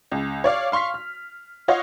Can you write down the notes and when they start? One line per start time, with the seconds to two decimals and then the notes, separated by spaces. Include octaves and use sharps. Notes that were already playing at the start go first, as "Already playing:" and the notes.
0.12 C#2
0.44 C#5 D5 F5
0.72 F5 C6 C#6 F6 B6
0.94 F6
1.68 F4 F#4 C#5 D#5 F5 F#5